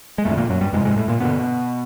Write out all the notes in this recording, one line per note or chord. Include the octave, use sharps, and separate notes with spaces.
G#3
F2 A2 D3 A3
A#2 A#3
F#2 F#3
G2 G3
F2 G#2 C3 G#3
G#2 G#3
A2 A3
A#2 A#3
G2 B2 D3 B3